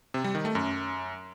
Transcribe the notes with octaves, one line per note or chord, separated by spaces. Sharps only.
C3
G3
D#3
A3
F#2